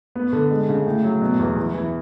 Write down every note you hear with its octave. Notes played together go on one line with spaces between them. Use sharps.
B3
D3
G#3
C#3
A2
F#3
B2
E2
E3
E3